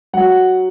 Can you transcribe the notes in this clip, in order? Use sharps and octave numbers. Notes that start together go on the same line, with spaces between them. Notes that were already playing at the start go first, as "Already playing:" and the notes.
F#3 F#5